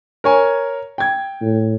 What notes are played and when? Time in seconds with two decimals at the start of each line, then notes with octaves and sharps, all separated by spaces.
0.24 A#4 C#5 G#5
0.98 G5 G#6
1.41 A2